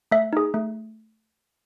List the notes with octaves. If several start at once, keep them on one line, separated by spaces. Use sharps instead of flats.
A3 E5
D#4 G#4
A3